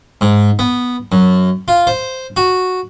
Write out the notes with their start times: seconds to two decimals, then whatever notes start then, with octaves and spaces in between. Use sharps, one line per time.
0.21 G#2
0.59 B3
1.12 F#2
1.68 F4
1.87 C5
2.37 F#4